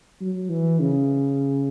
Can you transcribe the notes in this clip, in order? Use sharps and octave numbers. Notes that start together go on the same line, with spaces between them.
F#3
E3
C#3